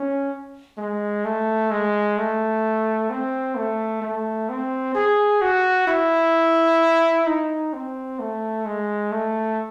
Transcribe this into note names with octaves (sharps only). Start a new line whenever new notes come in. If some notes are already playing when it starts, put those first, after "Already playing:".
Already playing: C#4
G#3
A3
G#3
A3
C4
A3
A3
C4
G#4
F#4
E4
D#4
C4
A3
G#3
A3